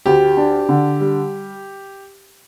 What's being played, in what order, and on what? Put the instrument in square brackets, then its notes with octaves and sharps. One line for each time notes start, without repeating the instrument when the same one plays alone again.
[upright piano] D2 [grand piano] G4
[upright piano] D4
D3
G3